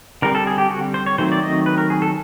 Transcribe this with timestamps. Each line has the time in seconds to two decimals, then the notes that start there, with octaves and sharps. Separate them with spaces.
0.22 D3 G3 C4 A#4
0.35 A4
0.47 G#4
0.58 G4
0.70 F#4
0.94 C5
1.06 C#5
1.18 D#3 F#3 A3 C4 C5
1.32 D5
1.42 D#5
1.66 B4
1.78 A#4
1.90 G#4
2.02 A4